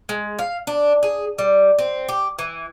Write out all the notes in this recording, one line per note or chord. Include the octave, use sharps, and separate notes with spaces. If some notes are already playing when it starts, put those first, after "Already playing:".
G#3
F5
D4
G#4
G3
C4
G4
E3